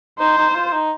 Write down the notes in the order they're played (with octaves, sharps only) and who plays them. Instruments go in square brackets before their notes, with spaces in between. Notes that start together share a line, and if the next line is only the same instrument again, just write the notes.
[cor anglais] D#4 [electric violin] C5
[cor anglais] D#4
D#4
F4
D#4